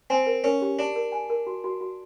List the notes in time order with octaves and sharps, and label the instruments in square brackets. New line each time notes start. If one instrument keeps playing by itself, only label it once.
[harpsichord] C4 [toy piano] G#5
[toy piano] A#4
[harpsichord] C#4 [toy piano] A#4
[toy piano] G4
[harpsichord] D4 [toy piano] G4
[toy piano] A#4
G#5
A#4
F#4
F#4
F#4